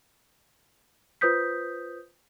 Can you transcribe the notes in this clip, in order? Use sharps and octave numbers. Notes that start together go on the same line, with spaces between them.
F4 B4 C5 D#6 G6 B6